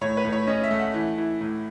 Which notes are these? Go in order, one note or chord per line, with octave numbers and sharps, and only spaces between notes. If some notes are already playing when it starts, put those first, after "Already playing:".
A2 C#5
B4
A2
C#5
C#4 D#5
E5
A3
F#5
E3
E3
A2